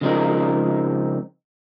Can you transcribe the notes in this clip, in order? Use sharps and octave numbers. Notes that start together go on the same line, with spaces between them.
C#3 F3 G#3 C4 D#4 A#4